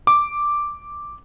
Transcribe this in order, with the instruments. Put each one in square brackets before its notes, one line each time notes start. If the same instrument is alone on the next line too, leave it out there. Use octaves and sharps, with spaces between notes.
[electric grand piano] D6